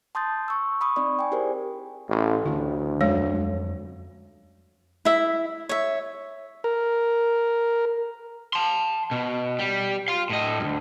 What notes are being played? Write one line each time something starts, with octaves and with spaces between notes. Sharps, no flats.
A5 C6 D#6 G6 A6
C#6 E6
B5 C#6 D#6
C4 D#4 D5 B5
G5 G#5
E4 G4 G#4 A#4 C5 D5
A1
D2 D3 E4
F2 F#3 G#3 C#4 C#5
E4 E5
C#5 E5
A#4
A5 C6
B2
G3
F5 C6
A2 D#5
D2 G2